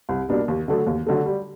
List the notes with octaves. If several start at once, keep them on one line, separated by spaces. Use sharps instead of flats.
C2
B2 G3 A#3 D4
D#2
D3 F#3 A3
D#2
D3 F#3 A3
G3